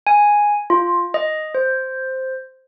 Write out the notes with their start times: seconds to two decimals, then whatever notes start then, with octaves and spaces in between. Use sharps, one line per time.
0.07 G#5
0.70 F4
1.14 D#5
1.55 C5